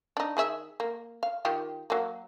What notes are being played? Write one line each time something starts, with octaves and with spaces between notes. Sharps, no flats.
D4 D#4
D#3 G#4 E5
A#3
F5
D#3 F4 G4
F#3 A#3